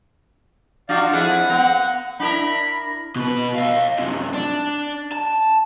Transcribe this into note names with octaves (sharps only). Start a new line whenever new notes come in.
D4 F4 F#4 D5 F5
F2 E4 G#4 F#5
A#3 B3
D4 E4 A#4 B5
B2 B4
D#5 F5
F#2 C3
D4
A5